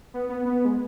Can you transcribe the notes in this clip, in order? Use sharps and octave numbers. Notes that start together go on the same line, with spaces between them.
B3
B3
B3
G#3